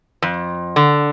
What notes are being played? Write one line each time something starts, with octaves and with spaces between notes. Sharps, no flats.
F2
D3